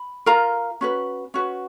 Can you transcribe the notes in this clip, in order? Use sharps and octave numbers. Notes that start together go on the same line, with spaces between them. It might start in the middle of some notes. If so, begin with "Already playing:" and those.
Already playing: B5
F4 A#4 A#5
C#4 F#4 B4
C#4 F#4 B4